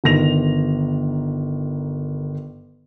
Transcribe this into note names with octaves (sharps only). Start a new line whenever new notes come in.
G1 D#3 A#6 F7